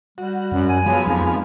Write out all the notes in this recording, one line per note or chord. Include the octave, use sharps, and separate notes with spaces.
G3 F#4
F#2
G#5
F3 F#3 G#3 B3
F2 D#4